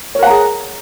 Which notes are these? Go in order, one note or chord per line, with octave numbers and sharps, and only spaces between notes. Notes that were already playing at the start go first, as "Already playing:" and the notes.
G#4 A#4 C#5 F#5 A#5